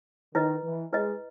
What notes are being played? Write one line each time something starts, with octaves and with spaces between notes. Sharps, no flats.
D#3 E4 B4 D#5
E3
G#3 E4 B4 D#5